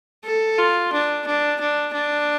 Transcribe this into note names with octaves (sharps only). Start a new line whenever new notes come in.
A4
F4
D4
D4
D4
D4